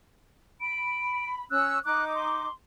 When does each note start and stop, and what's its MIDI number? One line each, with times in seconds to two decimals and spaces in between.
0.61 1.44 83
0.61 1.28 98
1.51 1.78 61
1.51 1.78 88
1.51 1.83 90
1.85 2.47 63
1.85 2.47 86
1.85 2.04 90
2.15 2.52 84